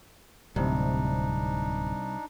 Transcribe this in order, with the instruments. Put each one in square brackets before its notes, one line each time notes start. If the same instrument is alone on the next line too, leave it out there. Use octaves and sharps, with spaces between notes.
[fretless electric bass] D1 C3 [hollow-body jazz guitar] C2 [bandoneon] D4 D#4